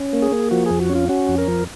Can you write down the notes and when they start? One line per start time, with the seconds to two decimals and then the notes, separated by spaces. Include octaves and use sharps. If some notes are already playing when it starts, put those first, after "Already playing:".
Already playing: C#4
0.13 A#3
0.22 G#4
0.32 A#3
0.51 F3 F#4
0.66 F2 G#4
0.80 F#4
0.90 C#4
0.95 F4
1.09 C#4 F#4
1.28 F2
1.38 A#4
1.48 F3